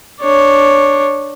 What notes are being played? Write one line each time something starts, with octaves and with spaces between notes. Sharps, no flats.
D4 C#5